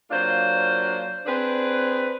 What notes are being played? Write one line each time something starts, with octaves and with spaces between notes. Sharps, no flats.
F#3 A#3 D4 F4 C5
C4 D4 G#4 B4